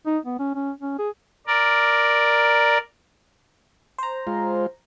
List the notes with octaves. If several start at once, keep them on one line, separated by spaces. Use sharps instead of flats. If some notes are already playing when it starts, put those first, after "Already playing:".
D#4
B3
C#4
C#4
C#4
G#4
A#4 D5
C5 A#5
G#3 F4